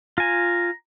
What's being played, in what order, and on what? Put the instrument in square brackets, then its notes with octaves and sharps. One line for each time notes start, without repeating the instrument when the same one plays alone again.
[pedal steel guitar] F4 G#5 [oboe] A#5